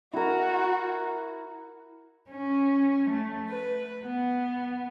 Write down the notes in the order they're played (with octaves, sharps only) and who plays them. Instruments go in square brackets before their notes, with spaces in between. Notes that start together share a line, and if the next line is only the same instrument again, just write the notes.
[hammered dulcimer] E4 A#4 [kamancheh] F#4
[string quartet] C#4
A3
B4
B3